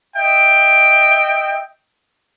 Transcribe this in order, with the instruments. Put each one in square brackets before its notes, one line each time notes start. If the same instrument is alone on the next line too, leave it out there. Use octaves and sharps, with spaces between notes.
[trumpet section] D#5 E5 G5